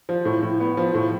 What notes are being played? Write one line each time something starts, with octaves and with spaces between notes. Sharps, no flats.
F3
A2
A2
B3
F3
A2